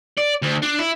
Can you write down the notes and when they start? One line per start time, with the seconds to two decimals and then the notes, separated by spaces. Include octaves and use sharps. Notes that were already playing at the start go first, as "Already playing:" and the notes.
0.18 D5
0.43 D2
0.63 D4
0.79 E4